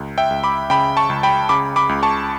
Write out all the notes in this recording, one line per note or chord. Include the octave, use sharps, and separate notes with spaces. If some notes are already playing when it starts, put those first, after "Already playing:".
Already playing: C#2
E5 G5
C#2
B5 D6
C#3 G5 B5
A5 C#6
C#2
G5 B5
C#3 B5 D6
B5 D6
C#2
A5 C#6